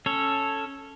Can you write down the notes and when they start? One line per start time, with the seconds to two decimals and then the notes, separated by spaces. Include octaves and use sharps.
0.06 C#4 A4 C#5